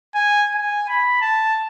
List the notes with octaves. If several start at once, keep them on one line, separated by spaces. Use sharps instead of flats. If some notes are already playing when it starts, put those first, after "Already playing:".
G#5
G#5
B5
A5